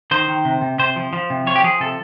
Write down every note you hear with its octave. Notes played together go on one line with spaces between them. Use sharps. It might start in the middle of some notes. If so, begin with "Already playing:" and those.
D#3 C5
D#3
C3
C3
C3 C5
F3
F3
C3
F3 C#5
G4
F3 G#4
C3 A4